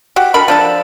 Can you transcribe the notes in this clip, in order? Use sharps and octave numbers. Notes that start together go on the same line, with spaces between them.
F#4 G4
D3 A#4 B5
F3 D4 A4